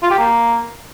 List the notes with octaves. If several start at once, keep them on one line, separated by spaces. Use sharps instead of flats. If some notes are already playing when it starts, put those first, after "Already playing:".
F4
G4
A#3